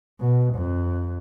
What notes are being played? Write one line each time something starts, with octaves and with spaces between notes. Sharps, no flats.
B2
F2